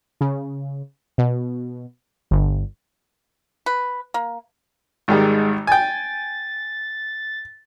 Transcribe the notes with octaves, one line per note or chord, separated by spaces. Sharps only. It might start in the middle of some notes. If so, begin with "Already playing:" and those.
C#3
B2
G1
B4
A#3
G#1 D#3 G3 G#3
G5 G#5 A6